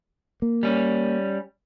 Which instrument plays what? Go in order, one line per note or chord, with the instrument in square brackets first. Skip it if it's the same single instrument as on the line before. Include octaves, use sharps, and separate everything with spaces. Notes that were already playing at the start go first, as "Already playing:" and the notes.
[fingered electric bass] A#3
[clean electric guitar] G3 C#4